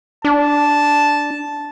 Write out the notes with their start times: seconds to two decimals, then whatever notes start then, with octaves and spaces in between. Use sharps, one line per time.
0.25 D4 A5